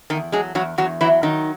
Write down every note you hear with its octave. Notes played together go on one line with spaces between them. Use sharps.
E2 D#3 D#4
F#3 G#3 G#4
E2 F#3 F#4
E2 F#3 F#4
E3 F#3 E4
D#3 F#3 D#4